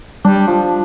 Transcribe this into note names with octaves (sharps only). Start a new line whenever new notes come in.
G3 D4
F3